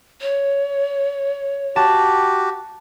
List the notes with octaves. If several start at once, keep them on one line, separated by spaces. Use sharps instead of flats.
C#5
F#4 G4 A5